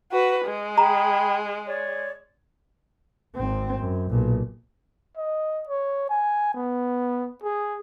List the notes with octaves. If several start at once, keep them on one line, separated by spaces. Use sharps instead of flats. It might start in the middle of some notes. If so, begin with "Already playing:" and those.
F#4 B4
G#3
G#4 G5 A#5 B5
C#5 D5
G#1 C4
F#2
B1 A#2
D#5
C#5
G#5
B3
G#4